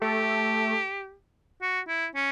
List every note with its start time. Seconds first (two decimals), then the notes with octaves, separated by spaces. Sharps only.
0.02 A3 G4
1.62 F#4
1.88 E4
2.15 C#4